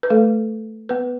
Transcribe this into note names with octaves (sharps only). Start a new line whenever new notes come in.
B4
A3 A4
B3 B4